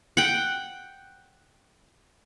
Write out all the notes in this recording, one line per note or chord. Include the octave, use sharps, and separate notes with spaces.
F#5 G5